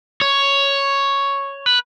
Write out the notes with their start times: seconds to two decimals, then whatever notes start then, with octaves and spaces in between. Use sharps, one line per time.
0.22 C#5
1.66 B4